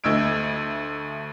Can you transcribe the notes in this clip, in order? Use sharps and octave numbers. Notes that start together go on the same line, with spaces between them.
D2 A3 D#5 E6 G#6 D7